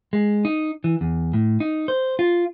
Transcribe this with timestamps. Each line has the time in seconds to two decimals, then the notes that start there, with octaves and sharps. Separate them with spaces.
0.13 G#3
0.45 D#4
0.84 E3
1.01 E2
1.33 A2
1.60 D#4
1.88 C5
2.19 F4